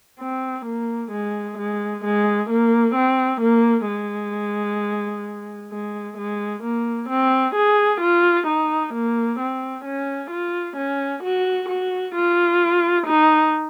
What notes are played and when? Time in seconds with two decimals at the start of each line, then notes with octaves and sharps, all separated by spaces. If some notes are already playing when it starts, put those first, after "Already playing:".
0.19 C4
0.65 A#3
1.12 G#3
1.58 G#3
2.04 G#3
2.50 A#3
2.95 C4
3.41 A#3
3.88 G#3
5.71 G#3
6.18 G#3
6.63 A#3
7.09 C4
7.55 G#4
8.01 F4
8.47 D#4
8.94 A#3
9.39 C4
9.85 C#4
10.31 F4
10.77 C#4
11.23 F#4
11.69 F#4
12.15 F4
13.07 D#4